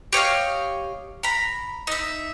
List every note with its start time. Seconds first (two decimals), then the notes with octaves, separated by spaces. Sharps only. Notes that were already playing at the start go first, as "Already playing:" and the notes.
0.13 G4 C#5 D#5 F5
1.23 A#5 B5
1.87 D#4 E5